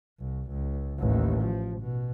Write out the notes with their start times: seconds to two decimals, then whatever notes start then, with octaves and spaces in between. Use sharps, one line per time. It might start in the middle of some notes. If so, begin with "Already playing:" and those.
0.20 C2
0.51 C#2
1.00 A1 D#2
1.41 F3
1.81 B2